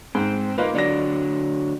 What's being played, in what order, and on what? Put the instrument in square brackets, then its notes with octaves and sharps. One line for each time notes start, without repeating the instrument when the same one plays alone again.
[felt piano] G#2 [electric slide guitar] C4
[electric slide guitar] A#3 [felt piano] D#4 F4 B4
[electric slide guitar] D3 F#3 [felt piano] D5 A#6